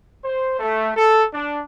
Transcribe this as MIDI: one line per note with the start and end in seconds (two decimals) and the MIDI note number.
0.25 0.59 72
0.59 0.91 57
0.97 1.24 69
1.34 1.62 62